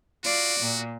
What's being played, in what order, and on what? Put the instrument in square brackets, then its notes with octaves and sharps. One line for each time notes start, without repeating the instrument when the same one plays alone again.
[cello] F4 D5 [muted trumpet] F#4
[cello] A#2